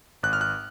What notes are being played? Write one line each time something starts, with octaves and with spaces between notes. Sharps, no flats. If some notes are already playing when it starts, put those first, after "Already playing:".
G#1 F#6
F6
F#6